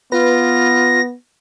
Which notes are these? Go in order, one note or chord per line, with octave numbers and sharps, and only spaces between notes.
B3 F4 B4 A#6